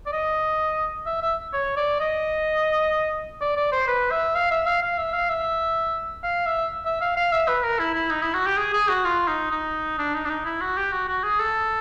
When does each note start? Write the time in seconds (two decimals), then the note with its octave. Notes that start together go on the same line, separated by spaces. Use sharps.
0.06 D5
0.13 D#5
1.06 E5
1.22 E5
1.53 C#5
1.77 D5
2.00 D#5
3.41 D5
3.57 D5
3.72 C5
3.88 B4
4.11 E5
4.35 F5
4.51 E5
4.66 F5
4.82 F5
4.98 E5
5.13 F5
5.29 E5
6.23 F5
6.46 E5
6.85 E5
7.01 F5
7.17 F5
7.32 E5
7.48 B4
7.64 A#4
7.79 E4
7.95 E4
8.10 D#4
8.23 E4
8.34 F#4
8.46 G4
8.57 G#4
8.73 G#4
8.89 F#4
9.05 F4
9.28 D#4
9.51 D#4
9.99 D4
10.14 D#4
10.25 D4
10.30 D#4
10.45 E4
10.61 F#4
10.77 G4
10.93 F#4
11.08 F#4
11.24 G#4
11.39 A4